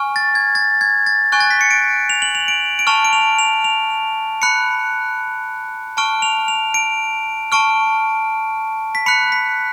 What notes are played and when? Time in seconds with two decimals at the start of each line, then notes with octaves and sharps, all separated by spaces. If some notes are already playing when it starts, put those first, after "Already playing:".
Already playing: G#5 C#6 F6
0.16 A6
0.35 G#6
0.55 A6
0.81 G#6
1.06 A6
1.32 G#5 C#6 F#6
1.40 A6
1.51 B6
1.61 C#7
1.71 D7
2.10 F7
2.22 F#7
2.35 F7
2.48 D7
2.79 D7
2.87 A5 C#6 F6 F7
3.05 D7
3.13 F7
3.39 F7
3.64 F7
4.42 B5 F#6 C#7
5.97 A5 C#6 F6 D7
6.22 F7
6.48 F7
6.74 D7
7.52 A5 C#6 F6 D7
8.95 B6
9.06 B5 F#6 C#7
9.32 B6